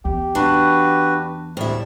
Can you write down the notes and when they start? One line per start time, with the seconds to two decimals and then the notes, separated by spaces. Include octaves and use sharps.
0.05 E2 G4
0.35 D4 F#4 B4
1.57 D2 A2 G3 C4 E5